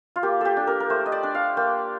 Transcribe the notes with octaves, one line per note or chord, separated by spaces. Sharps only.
F4
A#3 G4
G4 A4
D4
A#4
A#4
A3 C5
D#5
D5
D4
F5
A#3 G5